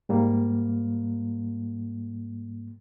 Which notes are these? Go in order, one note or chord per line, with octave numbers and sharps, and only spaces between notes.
G#2 G3 A#3